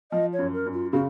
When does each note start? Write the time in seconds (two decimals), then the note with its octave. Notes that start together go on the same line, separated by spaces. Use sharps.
0.11 F3 D#5
0.33 C#5
0.39 F#2
0.53 A#4
0.66 F#2
0.73 F4
0.92 C#3 F#4